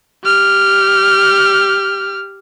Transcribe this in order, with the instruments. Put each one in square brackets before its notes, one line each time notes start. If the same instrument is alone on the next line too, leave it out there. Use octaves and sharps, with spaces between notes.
[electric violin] G4 F6